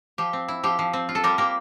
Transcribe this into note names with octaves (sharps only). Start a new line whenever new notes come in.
F3 G4
C4
E4
F3 G4
F3
C4
F4
A4
G3 G4 A#4
A#3 G4 A#4